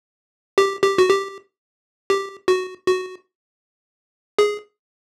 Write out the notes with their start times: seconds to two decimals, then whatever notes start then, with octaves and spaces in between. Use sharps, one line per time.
0.58 G4
0.83 G4
0.98 F#4
1.09 G4
2.10 G4
2.48 F#4
2.87 F#4
4.39 G#4